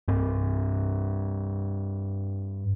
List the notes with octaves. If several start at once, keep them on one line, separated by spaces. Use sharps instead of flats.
G2 C4